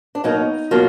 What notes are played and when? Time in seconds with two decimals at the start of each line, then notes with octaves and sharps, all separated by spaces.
0.15 D4
0.24 B2 F#3 A#3 D#4
0.71 B2 F#3 A#3 F4